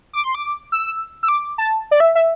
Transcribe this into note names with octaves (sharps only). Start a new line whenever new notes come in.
D6
C6
D6
E6
E6
D6
A5
D5
E5
E5